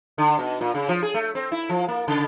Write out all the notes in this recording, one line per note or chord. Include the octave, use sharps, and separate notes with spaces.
D3
B2
A#2
C#3
F3
G#4
A3
C4
E4
F3
A#3
C#3